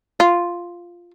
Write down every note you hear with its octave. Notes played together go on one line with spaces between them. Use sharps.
F4